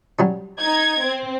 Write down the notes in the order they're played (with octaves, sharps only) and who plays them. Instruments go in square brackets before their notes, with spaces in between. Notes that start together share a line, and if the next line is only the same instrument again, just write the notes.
[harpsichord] F#3 G3 C#4
[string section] D#4 G#6
C4